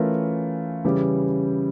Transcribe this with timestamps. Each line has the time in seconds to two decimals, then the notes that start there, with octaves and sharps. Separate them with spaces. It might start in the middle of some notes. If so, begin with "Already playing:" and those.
Already playing: E3 A3 C#4 F4 A#4
0.85 C#3 E3 G3 C#4 G4